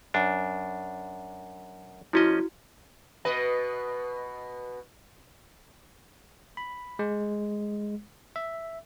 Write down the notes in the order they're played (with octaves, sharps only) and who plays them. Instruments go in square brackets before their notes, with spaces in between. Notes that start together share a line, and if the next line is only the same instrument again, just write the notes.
[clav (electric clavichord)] F#2 D4
[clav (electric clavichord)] F3 C#4 D#5 [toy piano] E4 F#4
[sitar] B2 B4 D#5
[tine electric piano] B5
G#3
E5